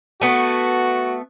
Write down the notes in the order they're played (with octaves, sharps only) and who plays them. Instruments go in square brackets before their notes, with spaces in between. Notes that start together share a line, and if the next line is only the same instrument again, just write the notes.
[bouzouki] A3 B3 [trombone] F#4